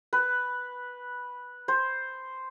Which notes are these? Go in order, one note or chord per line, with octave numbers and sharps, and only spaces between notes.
B4
C5